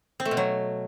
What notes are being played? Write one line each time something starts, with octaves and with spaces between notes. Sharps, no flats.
C4
A3
B2
F#3